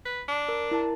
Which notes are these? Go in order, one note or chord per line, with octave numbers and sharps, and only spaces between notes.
B4
D4
A#4
E4 A#4 A5